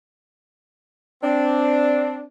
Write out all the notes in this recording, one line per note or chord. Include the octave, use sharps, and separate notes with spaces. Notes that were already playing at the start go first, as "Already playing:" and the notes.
C4 D4